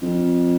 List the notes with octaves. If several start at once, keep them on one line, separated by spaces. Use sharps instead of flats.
F2